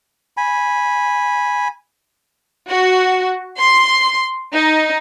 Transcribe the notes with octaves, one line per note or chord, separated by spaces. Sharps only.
G#5 B5
F#4
C6
D#4